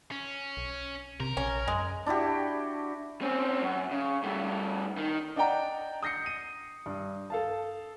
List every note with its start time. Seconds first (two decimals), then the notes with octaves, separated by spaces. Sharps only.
0.11 C#4
0.57 B1
1.20 C3 A#4
1.37 A#1 C#4
1.68 F#2 G#3
2.06 D4 E4 F#4 G4
3.22 C4 C#4
3.62 F#2
3.91 C#3
4.23 G2 A3
4.98 D#3
5.36 D4 D#5 F#5 G5 A#5
6.03 D#6 G6 A#6 C7 C#7
6.23 C#7 D#7
6.86 G2
7.30 A4 F5 A5